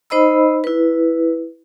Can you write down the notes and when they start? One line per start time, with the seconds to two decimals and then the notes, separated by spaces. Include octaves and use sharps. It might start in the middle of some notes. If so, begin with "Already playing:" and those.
0.10 D#4 C5 D#5 B5 E6
0.64 E4 B4